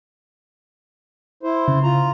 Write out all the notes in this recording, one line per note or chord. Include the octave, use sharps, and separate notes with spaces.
E4 C5
C#3
F4 A#5